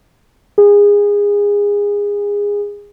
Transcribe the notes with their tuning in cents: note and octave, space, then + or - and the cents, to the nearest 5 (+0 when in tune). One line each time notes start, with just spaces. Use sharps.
G#4 -25